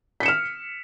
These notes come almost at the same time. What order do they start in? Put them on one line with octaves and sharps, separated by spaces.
B6 C#7 E7 F6